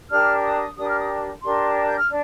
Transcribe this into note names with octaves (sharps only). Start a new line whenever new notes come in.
D4 G4 A#4 F6
D#6
D4 G4 A#4 D#6
F6
D#6
D4 G4 A#4 C6
G6
F6
D4